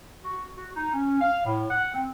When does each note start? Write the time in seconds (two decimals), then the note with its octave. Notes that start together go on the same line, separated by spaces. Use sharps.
0.24 F#4
0.57 F#4
0.76 D#4
0.93 C#4
1.21 F5
1.46 A2
1.71 F#5
1.94 C4